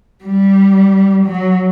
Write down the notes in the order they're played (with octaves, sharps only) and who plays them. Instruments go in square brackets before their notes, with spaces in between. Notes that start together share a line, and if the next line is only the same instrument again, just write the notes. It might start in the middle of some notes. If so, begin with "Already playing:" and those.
[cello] G3
F#3